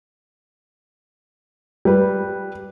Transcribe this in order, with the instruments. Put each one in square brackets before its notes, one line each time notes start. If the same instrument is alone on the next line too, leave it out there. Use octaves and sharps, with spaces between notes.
[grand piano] G3 B4